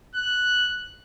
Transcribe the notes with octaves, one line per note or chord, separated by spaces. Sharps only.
F#6